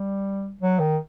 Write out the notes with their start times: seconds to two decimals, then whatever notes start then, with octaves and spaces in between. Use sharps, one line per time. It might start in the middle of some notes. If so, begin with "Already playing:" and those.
Already playing: G3
0.61 F#3
0.80 D#3